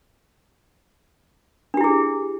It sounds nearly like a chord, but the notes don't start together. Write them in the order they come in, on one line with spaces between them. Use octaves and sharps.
D4 G4 E4 G#4